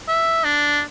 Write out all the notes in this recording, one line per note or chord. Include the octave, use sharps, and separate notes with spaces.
E5
D4